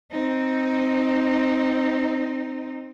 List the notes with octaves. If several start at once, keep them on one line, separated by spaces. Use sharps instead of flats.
C4 D#4